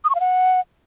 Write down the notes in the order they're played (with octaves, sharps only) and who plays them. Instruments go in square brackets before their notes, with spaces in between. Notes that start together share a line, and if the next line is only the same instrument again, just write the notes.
[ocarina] D#6
C#6
F5
F#5